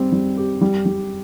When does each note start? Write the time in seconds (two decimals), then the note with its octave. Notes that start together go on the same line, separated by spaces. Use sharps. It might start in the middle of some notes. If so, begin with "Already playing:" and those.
Already playing: G3 C4
0.12 G3
0.37 G4
0.61 G3
0.86 G3